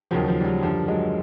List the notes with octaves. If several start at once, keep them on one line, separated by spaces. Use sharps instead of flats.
D#2 C#3 F3 F#3
F3
G3
F#3
F#2 D3 F3 G3
F#3 G#3